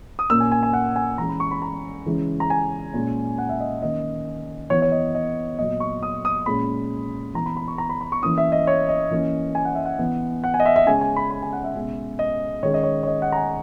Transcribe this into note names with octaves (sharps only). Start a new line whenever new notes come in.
D#6
A#2 A#3 C#4 E6
G#5
G#5
G#5
F#5
G#5
E3 G#3 C#4 A#5
B5
C#6
B5
A#5
C#3 E3 G#3 C#4
A#5
G#5
A#2 G#3 C#4
F#5
E5
D#5
D#3 A#3 C#4 D#5
E3 B3 C#5
C#5
D#5
D#5
A#2 F#3 B3 D#5
C#6
D#6
D#6
A#2 G#3 C#4 B5
E3 B3 A#5
B5
B5
C#6
A#5
B5
B5
C#6
E3 A#3 C#4 D#6
E5
D#5
C#5
D#5
E3 A#3 C#4
G#5
F#5
E5
F#5
E3 B3
F#5
G#5
D#5
E5
E5
C#3 G#3 C#4 G#5
G#5
B5
B5
G#5
F#5
E5
B2 G#3 C#4
D#5
D#3 G#3 C#4 C#5
D#5
C#5
C#5
D#5
F#5
A#5
G#5